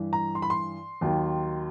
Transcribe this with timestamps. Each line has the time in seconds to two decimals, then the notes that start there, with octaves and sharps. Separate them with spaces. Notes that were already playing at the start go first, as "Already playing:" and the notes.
Already playing: G2 E3
0.13 A#5
0.35 C6
0.42 B5
0.50 C6
1.01 D#2 D#3 F#3